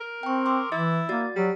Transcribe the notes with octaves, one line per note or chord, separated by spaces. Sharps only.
A#4
C4 G5 C#6
C6 D6 E6
E3 E4 A6
A#3 F#4 D5 A6
F#3 G3